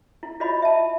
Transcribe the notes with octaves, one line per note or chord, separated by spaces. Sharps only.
E4
F4 F#4 C#5 D#5 B5 C6
E5 A5